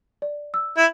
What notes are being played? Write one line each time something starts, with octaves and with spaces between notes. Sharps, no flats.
D5
E6
E4